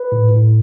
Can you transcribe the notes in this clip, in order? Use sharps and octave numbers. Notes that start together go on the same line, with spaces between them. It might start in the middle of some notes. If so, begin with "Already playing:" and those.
Already playing: B4
A2
A2